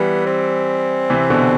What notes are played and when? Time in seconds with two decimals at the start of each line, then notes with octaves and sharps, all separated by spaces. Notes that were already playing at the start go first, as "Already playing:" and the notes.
Already playing: E3 G3 B3
0.26 C4
1.10 C3 E3
1.30 B2 D3